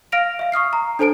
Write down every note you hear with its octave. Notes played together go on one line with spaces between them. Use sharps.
F5 F6 A#6 D7 F7
E5 F5
C#6 D#6 F6 C7
A#5
D4 A4 C5 A5 D7